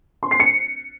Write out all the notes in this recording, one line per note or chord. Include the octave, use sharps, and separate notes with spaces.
C6
C7
C#7